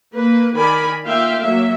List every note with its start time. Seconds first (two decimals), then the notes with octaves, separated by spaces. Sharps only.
0.15 A#3 B4
0.56 D#3 A#4 D5 G#5 B5
1.06 A#3 F4 E5 F5 G5
1.40 F#3 A#3 E5